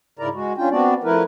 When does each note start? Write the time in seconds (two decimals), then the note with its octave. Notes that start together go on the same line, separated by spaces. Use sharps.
0.19 G#2 C#3 E4 A#4 D5 A#5
0.34 G#3 F#4
0.58 C#4 D4 F4 G5
0.71 B3 C4 D4 F#4 D5
1.04 F3 A3 E4 A#4 B4